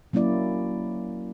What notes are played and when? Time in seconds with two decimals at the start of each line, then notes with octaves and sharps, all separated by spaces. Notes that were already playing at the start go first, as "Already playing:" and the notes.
0.13 F#3 A#3 C#4 E4 D5